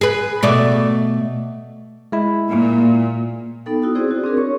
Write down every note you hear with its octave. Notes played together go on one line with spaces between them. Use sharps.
G#4 B4
B2 A3 D5
G#3 E4
A#2
B3 D#4 A4 G5
E4 F#4 D#6
C4 E4 G#4 C5 D5
F#4
C4 D4 G#4 A#4
C#5 C#6